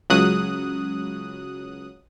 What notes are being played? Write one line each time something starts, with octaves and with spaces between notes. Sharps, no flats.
C#2 C#3 F#3 D#6 F#6